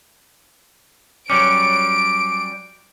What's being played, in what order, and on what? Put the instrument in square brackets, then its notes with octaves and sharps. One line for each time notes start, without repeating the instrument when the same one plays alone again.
[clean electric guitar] F#3 G3 C#4 [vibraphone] D6 [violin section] D7